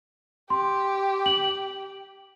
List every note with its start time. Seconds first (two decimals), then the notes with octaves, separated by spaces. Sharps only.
0.50 G4 C6
1.26 F#7